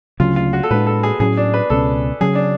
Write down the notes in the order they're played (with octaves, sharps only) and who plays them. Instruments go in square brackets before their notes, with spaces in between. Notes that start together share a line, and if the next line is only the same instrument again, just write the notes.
[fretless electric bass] D2 C#3 F#3 C#4 [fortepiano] F4
[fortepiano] F4
F#4
A4
[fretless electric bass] A2 G#3 D4 [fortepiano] B4
[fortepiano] A4
G#4
[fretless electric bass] A2 F#3 C#4 [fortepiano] G#4
[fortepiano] D4
B4
[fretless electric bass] C#2 B2 A3 C#4 [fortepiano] A4
[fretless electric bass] C#3 F#3 C#4 [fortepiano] G#4
[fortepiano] D4